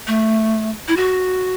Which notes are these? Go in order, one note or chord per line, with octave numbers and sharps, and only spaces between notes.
A3
E4
F#4